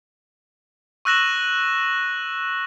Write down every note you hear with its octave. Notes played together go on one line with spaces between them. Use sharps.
C#6 E6 F#6 A#6 E7 F#7